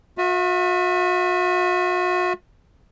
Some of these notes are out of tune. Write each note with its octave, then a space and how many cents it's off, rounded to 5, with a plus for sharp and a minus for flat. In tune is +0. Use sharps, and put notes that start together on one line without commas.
F#4 -45 E5 +0